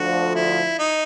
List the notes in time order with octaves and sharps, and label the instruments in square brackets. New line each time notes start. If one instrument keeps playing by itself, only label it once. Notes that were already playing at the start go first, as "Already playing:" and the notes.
Already playing: [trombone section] D2 D3 F3 [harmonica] F#4
[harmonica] E4
D#4